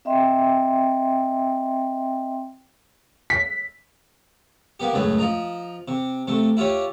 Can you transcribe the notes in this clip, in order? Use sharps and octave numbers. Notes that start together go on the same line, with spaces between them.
C4 D#5 E5 G5 C6
B6
A#3 B3 G4
C#2 F#2 A2 G#4 B4
F3 D#5 A#5
C3
C3 A3
E4 F4 G4 C#5